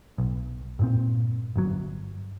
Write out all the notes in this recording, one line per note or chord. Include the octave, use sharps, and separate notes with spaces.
B1
G2 A#2 C4
G1 F#3